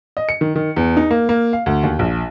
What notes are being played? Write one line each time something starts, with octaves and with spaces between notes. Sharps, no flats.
D#5
C#7
D#3
D#3
E2
D#4
A#3
A#3
F5
D2
D#2
A#1